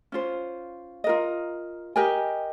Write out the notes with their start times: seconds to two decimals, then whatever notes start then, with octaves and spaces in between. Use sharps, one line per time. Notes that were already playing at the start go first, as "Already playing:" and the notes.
0.12 C#4 F4 C5
1.04 F4 A#4 D#5
1.96 G4 A#4 D#5 G#5